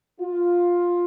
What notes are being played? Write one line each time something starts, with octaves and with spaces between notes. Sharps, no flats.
F4